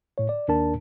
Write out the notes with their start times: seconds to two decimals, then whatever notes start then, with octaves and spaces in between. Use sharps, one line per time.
0.18 A2 C#5
0.29 D5
0.48 D#2 D4 A#4 A5